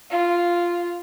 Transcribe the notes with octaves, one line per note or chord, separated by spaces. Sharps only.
F4